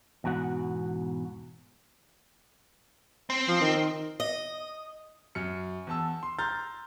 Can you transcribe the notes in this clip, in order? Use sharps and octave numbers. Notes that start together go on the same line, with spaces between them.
E2 G#2 B2 F#4 F#5
C4
F3
D#3
D#5
F#2 F6 C#7
E2 A5 E6
C6
A#5 C6 F6 G6 A6